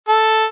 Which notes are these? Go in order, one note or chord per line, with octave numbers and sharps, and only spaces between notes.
A4